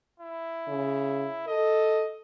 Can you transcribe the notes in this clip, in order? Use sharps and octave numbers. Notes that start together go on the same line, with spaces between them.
E4
C#3
A4 D#5